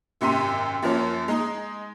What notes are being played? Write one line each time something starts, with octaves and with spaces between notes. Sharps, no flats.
G#1 F#2 C3 C6 B6 D#7
F#2 F3 A#3 C#4
G#3 D#4